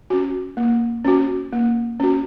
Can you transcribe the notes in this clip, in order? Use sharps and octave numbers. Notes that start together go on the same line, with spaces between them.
C#4 F#4
A#3
C#4 F#4
A#3
C#4 F#4